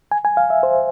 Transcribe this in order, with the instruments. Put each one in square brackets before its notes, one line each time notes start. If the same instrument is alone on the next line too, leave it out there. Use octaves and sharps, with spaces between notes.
[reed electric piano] G#5
G#5
F5
E5
C5